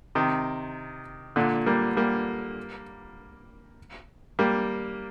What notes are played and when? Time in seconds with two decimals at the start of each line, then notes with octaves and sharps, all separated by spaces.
0.15 C3 D#3
1.36 A#2 D3
1.66 G3 A#3
1.97 G3 A#3
4.39 G3 A#3